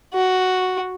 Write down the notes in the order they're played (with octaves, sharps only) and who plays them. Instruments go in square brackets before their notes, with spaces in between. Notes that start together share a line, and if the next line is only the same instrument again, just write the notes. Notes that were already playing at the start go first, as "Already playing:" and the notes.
[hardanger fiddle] F#4